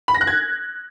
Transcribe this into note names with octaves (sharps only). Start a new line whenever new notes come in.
B5
A#6
F#6
G#6